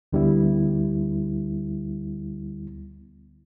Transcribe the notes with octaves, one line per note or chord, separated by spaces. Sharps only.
D2 D3 G3 B3 E4